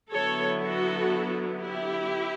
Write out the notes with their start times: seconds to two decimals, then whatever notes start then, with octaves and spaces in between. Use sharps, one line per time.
0.12 D3 F#3 B3 E4 A4 C#5
0.62 F#4 A4
1.59 E4 G4